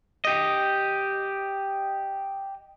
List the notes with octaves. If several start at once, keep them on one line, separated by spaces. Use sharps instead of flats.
G4 D#5